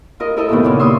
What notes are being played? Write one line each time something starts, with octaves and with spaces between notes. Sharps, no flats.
F4 A#4 D#5
E4 A4 A#4 D#5 E5
G2 A#2 D#3 B3
A#2 C#3 E3
E5 C6 C#6 D#6 E6